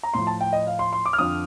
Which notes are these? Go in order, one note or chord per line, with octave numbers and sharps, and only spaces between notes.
A#5
A2 F3 C6
A5
G5
D#5
F5
C6
C6
D6
F6
F2 D3 F3 D#6